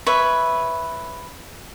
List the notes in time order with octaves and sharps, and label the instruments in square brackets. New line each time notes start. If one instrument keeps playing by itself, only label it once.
[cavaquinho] B4 C#5 E5